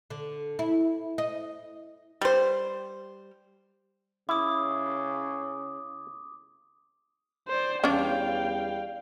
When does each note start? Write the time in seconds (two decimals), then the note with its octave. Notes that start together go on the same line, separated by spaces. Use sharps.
0.10 D3
0.59 E4
1.18 D#5
2.21 G3 C5
4.29 C#3 E4 D6 D#6
7.48 C5 D5
7.84 E2 G3 C#4 D4 F5 G5